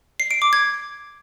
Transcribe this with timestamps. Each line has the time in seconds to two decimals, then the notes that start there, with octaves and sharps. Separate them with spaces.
0.20 C7
0.31 D7
0.42 D6
0.53 G#6